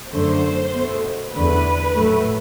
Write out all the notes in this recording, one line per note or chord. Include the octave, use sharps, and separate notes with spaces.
F#2 D3 F#3 A3 C5
B2 A3
E2 D3 A3 B4
A2 F#3 A3